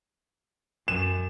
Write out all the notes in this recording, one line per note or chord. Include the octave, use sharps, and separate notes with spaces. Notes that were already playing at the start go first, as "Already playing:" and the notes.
F#2 E7